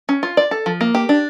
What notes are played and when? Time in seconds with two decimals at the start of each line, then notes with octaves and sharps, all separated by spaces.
0.09 C#4
0.23 F4
0.37 D5
0.51 A4
0.66 F3
0.81 A#3
0.95 G4
1.09 D4